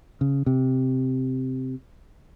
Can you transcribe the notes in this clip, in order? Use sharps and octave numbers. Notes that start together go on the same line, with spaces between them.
C#3
C3